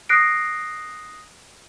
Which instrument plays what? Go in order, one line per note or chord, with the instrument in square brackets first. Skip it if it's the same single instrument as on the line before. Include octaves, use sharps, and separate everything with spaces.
[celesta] D#6 F#6 A#6 C7 D7